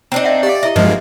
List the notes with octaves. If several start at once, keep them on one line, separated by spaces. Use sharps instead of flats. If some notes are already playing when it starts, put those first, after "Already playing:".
C4 D4 D#4 A#5
D#5 E5 F#5
G4 D5 F5
E4 D#5 E5
G2 F3 G#3 A#3 D#5